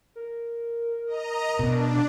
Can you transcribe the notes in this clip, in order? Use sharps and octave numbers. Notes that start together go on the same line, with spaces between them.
A#4
D#5 A#5
B2 D4